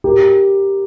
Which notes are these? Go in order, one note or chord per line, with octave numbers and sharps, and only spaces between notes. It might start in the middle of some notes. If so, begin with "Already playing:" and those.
G4 A#4